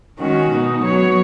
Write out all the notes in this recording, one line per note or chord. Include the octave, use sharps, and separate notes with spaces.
D#3 G#3 C#4 F#4
B2 G#3 D#4
F#3 B3 F#4 C#5